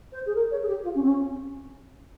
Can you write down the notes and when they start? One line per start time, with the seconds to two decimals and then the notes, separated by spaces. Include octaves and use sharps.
0.12 C5
0.26 G#4
0.35 A#4
0.51 C#5
0.62 G#4
0.67 G4
0.83 F4
0.94 C#4
1.02 C4
1.07 C#4